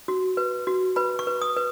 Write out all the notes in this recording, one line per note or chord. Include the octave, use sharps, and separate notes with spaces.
F#4
B4
F#4
B4 B5
C#6
B4
D#6
B4